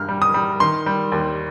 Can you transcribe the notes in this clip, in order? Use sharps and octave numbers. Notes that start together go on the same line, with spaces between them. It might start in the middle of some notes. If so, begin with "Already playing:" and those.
Already playing: G2 F6
G3
D#6
G3
D#3 C6
G3
D#2